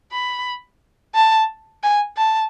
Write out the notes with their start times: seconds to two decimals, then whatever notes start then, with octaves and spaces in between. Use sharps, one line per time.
0.12 B5
1.15 A5
1.83 G#5
2.17 A5